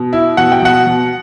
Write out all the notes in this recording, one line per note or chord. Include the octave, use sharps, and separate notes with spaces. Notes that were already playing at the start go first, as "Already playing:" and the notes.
Already playing: B2
E4
B2 F#5
G5
B2 F#5
B2